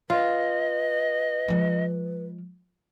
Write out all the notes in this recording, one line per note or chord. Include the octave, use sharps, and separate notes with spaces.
F4 B4 D#5
F3 G#3